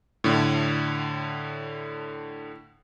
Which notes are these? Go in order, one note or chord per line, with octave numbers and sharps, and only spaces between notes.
A2 D3